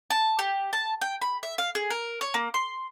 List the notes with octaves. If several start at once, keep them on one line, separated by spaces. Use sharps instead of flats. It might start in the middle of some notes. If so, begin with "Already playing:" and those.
A5
G4
A5
G5
B5
E5
F5
G#4
A#4
C#5
A#3
C6